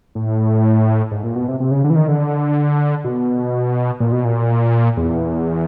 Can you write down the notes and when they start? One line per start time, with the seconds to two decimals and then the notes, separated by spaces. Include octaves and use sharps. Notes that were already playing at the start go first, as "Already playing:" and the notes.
0.15 A2
1.11 G#2
1.24 A#2
1.36 B2
1.48 C3
1.60 C3
1.71 C#3
1.84 D3
1.90 E3
1.96 D#3
2.08 D3
3.04 B2
4.00 A#2
4.12 B2
4.25 A#2
4.97 E2